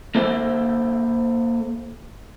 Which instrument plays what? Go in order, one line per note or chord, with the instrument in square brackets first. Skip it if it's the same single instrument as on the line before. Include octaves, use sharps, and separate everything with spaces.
[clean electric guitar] A#3 A4 C5 E5